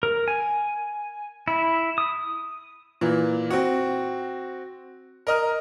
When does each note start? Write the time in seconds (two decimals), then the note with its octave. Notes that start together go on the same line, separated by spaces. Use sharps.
0.03 A#4
0.28 G#5
1.48 E4
1.98 D#6
3.01 A#2 E3
3.50 C4 F#4
5.27 A#4 D#5 F6